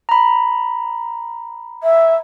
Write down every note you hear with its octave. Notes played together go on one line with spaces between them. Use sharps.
A#5 B5
E5